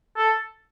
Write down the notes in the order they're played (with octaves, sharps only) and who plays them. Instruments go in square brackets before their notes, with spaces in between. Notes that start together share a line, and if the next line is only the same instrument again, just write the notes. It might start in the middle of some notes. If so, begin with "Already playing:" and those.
[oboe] A4